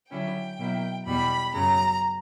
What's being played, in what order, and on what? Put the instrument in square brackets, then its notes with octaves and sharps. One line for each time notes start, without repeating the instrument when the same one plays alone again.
[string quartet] D3 F#3 C#4 E4 G5
B2 F#3 A#3 E4
E2 B2 G3 B5
F#2 C#3 F#3 A#5